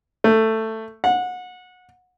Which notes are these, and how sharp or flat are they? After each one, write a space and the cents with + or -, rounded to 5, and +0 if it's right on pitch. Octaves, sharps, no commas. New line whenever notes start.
A3 +10
F#5 -25